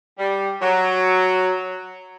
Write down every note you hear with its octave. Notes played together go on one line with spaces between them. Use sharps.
G3
F#3